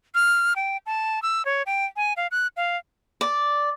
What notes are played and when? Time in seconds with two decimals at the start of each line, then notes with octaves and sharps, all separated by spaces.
0.15 F6
0.56 G5
0.86 A5
1.22 E6
1.45 C#5
1.66 G5
1.96 G#5
2.17 F5
2.31 F#6
2.57 F5
3.21 D5